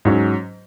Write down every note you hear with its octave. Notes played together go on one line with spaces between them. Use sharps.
G#2 F#3 C#4